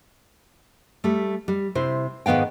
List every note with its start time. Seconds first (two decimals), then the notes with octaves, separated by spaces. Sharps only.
1.04 G3 A3
1.48 G3
1.75 C3 E4 C5
2.26 G#2 D#3 B3 F5 G5